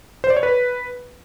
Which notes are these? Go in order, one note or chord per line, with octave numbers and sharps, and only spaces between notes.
C5
D5
C#5
B4